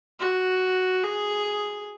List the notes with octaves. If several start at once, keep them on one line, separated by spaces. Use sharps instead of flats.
F#4
G#4